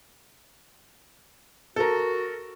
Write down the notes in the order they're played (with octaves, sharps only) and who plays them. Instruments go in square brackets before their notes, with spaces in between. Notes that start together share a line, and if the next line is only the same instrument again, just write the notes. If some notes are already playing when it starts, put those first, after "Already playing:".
[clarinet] F#4 [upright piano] A4 A#4